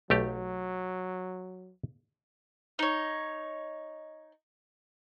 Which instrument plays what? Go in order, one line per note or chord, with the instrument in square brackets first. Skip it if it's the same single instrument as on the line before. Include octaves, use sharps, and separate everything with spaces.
[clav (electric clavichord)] B1 A3 G4 [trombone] F#3
[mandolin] D#4 C#5